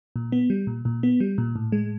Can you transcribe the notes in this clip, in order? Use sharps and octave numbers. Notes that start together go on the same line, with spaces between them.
A#2
B3
G3
A#2
A#2
B3
G3
A#2
A2
G#3